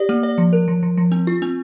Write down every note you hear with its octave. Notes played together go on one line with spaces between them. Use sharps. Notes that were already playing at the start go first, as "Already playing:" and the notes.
Already playing: G4 D5
A#3
D5
F3
A#4
F3
F3
F3
C4
F4
C4